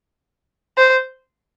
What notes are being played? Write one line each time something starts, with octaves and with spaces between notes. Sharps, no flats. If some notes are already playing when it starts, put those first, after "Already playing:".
C5